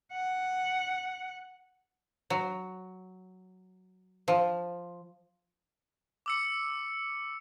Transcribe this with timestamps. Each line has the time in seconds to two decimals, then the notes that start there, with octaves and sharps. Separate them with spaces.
0.13 F#5
2.30 F#3
4.28 F3
6.26 D6 E6 C#7